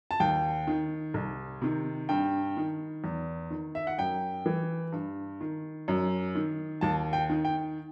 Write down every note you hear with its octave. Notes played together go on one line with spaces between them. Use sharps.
A5
D#2 G5
D#3
C2
C3 D#3
G2 G5
D#3
E2
D#3
E5
F#5
F#2 G5
E3
G2
D#3
F#2
D#3
D#2 A5
G5
D#3
G5